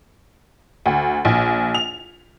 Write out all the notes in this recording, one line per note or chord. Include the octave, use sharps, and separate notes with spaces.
D2
A#1
F7